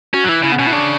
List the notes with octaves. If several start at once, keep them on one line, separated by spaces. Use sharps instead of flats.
C#4 F#4
F#3
E3 E4
C#3 E4
B3
B2 C#4
E4
C#3 D4